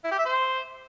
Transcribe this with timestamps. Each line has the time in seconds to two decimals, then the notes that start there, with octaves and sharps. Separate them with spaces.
0.04 E4
0.11 G4
0.18 E5
0.25 C5